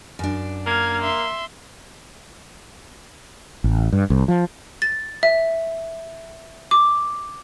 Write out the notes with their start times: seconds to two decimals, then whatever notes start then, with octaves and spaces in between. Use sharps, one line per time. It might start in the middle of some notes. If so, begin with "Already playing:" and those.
0.19 F#2 D4
0.66 A#3 F6 G#6
1.02 E5 C6
3.64 A1
3.92 G2
4.10 C2
4.28 F3
4.82 A6
5.23 E5
6.71 D6